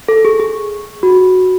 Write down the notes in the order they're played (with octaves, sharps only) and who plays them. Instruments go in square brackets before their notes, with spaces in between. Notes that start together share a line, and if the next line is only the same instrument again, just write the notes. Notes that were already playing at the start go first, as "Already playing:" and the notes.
[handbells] A4
G#4
G#4
F#4